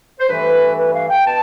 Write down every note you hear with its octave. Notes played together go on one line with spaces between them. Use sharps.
C5
G2 E3 A3 B4
B4
F5
G5
B2 A5